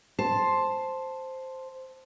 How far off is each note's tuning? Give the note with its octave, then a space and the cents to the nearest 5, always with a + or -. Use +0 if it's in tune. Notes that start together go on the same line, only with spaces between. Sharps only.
C5 +0 A5 +0